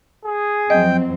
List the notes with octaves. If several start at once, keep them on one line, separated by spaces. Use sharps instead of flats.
G#4
F2 F#3 C4 D#5 G5